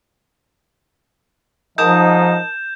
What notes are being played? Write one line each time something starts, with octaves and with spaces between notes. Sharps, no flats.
G#2 F3 D#4 A#4 A5 D#6 G6 E7